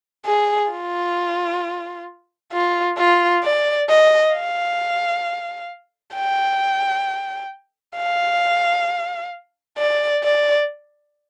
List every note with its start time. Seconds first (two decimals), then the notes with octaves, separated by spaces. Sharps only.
0.26 G#4
0.72 F4
2.53 F4
2.98 F4
3.44 D5
3.90 D#5
4.34 F5
6.16 G5
7.97 F5
9.78 D5
10.23 D5